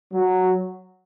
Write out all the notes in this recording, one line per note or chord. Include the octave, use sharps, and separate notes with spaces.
F#3